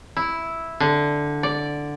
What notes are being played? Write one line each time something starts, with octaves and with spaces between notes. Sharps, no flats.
E4
D3
D5